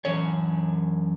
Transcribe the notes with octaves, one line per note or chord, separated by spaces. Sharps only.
F#2 E3 C#4 C#5